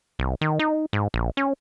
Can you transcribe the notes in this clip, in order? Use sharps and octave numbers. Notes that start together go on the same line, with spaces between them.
C2
D#3
D#4
G#2
A#1
C#4